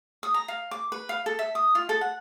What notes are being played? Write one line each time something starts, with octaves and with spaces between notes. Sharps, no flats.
D#6
A#5
F5
D6
B4
F5
A4
E5
D#6
F4
A4
F#5